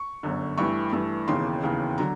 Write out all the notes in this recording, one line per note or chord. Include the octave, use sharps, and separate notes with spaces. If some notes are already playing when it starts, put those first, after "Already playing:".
Already playing: C#6
G1 F#2 D3
G2 E3 A3 C#6
G2 E3 A3
E1 D#2 C#3 E3 C6
E1 D#2 C#3 E3
D3 F#3 A#5